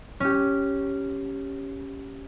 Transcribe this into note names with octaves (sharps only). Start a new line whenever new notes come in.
C#4 G4